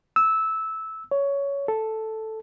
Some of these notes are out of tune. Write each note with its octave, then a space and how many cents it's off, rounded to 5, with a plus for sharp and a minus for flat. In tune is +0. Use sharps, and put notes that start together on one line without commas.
E6 -15
C#5 +15
A4 +0